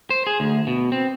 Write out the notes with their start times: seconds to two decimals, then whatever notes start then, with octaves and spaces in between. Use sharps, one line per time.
0.10 C5
0.27 G#4
0.40 D2
0.67 B2
0.92 C4